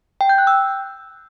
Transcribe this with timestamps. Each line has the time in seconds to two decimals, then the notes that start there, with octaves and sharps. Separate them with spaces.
0.21 G5
0.29 G6
0.38 F#6
0.47 E6